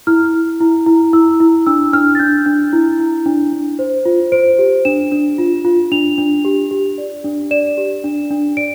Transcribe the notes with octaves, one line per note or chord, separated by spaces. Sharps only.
E4 F6
E4
E4
E4
E4 E6
E4
D4 E6
D4 F6
A6
D4 G6
D4
E4
E4
D4
D4
C5
F4
C5 D7
G4
D4 E7
D4
F4
F4
D4 F7
D4
G4
G4
D5
D4
D5 E7
G4
D4
D4
D5 D7